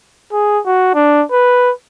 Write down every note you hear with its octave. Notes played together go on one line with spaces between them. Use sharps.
G#4
F#4
D4
B4